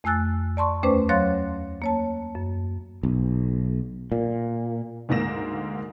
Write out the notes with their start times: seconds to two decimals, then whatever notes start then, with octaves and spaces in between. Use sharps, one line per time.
0.04 F2 A3 G#5 E6 F#6 A6
0.57 D5 A5 C6 C#6
0.83 D#2 A3 C#4 B4 C5 D6
1.09 F#3 C#5 F5 C6 F#6 A6
1.82 A#3 C#5 A5
2.35 F#2
3.03 B1
4.12 A#2
5.09 D2 G#2 A#3 A#6 E7